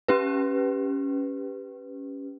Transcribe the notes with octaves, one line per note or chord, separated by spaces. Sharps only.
C#4 G4 B4